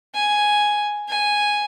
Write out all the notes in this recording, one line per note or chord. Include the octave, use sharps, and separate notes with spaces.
G#5
G#5